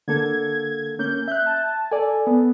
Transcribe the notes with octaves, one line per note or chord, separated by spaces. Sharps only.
D3 A#3 A4 G#6
A#3 C#4 G6
E5 F#6 G6
A5
A4 D5 G#5
B3